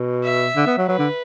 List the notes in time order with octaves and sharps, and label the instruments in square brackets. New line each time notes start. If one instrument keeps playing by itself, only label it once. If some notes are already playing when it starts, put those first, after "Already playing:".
Already playing: [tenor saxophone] B2
[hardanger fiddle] E5
[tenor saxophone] D3
B3
F#3
[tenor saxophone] F#3 [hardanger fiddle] B4
[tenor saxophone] D3